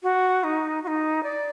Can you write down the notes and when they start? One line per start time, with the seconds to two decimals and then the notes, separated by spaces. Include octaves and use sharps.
0.03 F#4
0.43 D#4
0.83 F#4
0.87 D#4
1.23 D5